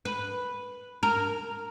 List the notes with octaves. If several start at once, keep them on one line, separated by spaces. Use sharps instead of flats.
B4
A#4